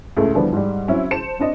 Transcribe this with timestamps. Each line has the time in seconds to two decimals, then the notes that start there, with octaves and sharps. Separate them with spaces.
0.17 C#2 A2 C#3 A3
0.34 D3 E3 F3 G3 B3
0.52 G#2 G3
0.88 F#3 C4 C#4 E4
1.11 C5 A5 C#7 E7
1.39 C4 D4 D#5